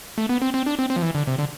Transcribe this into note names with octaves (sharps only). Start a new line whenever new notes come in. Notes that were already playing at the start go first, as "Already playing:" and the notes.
A3
B3
C4
C4
D4
C4
C4
F3
E3
D3
C3
D3